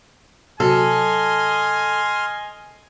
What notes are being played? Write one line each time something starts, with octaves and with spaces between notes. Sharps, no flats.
C3 F#3 F#4 A4 D#5 G#5 C6 F6